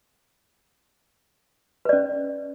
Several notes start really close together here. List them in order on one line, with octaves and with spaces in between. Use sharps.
B4 D5 C#4